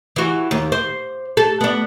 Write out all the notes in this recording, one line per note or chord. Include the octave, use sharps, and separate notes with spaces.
E3 F#4
D#2
C5
A4
B3 D4